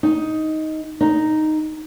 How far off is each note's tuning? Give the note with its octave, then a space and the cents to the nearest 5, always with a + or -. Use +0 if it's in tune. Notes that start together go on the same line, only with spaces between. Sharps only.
D#4 +10
D#4 -5